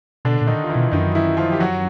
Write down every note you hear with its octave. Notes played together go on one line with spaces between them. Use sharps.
B2 D3 D4
A#2
D#3 D#4
F4
E3 E4
B2
F#2 D#3 D#4
E3 E4
F3 F4
G4
F#3 F#4